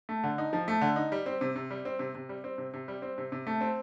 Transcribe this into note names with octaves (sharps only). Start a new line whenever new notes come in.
A3
D3
D#4
F3
A3
D3
D#4
G3
C4
C3
C3
G3
C4
C3
C3
G3
C4
C3
C3
G3
C4
C3
C3
A3
C4